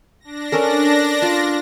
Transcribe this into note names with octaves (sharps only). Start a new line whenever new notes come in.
D4 A#6
C#4 A4 A#4
F4